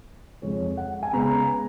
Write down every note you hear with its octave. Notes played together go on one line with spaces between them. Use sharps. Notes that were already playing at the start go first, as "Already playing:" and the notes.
F2 F3 G#3 C#5
F#5
G#5
C#3 G#3 B3 A#5